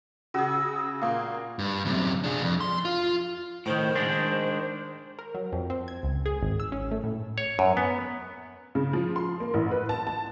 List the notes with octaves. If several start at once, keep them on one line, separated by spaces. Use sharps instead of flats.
C#3 F#4 G#4 E6
A#2 A#3 F5 C#6
G2
F#2 C3
D4 G#4
F2
C6
F4
A2 D#3 C5
D#3 G#3 D4
A#4
F#3
F2
C4
G#6
C#2
G#4
G#1
E6
C#4
A3
A2
C#5
F#2
B3
C#3
F3
C6
A#3
A1
B4
A5
A5